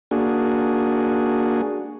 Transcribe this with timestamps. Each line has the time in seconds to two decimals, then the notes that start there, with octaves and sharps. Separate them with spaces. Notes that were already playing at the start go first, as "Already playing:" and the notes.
0.11 A#3 D4 F#4 G#4